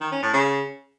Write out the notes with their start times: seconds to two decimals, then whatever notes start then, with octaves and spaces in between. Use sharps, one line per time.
0.01 D#3
0.12 C#4
0.22 A2
0.33 C#3